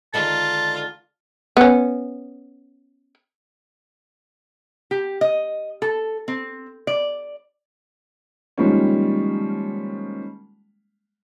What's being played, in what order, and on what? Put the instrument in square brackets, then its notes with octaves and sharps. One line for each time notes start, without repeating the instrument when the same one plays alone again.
[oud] D3 D#3 G#3 [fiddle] F4 [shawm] A5
[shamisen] B3 C#4
[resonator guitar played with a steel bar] G4
D#5
A4
C4
D5
[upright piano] D#3 F3 G3 G#3 A#3 C#4